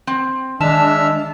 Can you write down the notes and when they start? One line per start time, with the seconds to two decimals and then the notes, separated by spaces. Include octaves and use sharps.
0.07 C4
0.61 D#3 G#3 D4 E5 A5 E6 F6